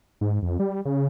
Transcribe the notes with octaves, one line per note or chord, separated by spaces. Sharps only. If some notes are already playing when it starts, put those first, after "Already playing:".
G#2
F2
G3
C#3